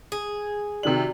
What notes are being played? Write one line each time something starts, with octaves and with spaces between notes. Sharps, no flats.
G#4
C3 D#3 F#4 G4 D5 F#7